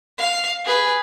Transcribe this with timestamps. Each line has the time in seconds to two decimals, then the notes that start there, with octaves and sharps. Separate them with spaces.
0.18 F5
0.65 G#4 B4